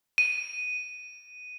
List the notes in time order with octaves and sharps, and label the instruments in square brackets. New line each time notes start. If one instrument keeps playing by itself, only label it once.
[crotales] D#7